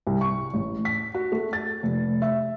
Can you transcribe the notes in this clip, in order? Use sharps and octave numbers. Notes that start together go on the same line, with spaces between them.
C2
C#6
A1
B6
F#4
A3
A6
F1
E5